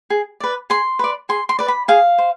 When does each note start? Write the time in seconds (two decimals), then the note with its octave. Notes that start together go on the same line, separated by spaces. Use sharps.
0.10 G#4
0.40 B4 D5
0.70 G#4 C6
0.99 B4 D5
1.29 G#4 C6
1.49 C6
1.59 B4 D5
1.68 B5
1.88 G#4 F5
2.18 C5